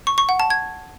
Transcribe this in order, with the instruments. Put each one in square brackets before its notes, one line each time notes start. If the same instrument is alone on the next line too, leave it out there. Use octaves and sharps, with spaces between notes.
[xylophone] C#6
C#6
F#5
A5
G#6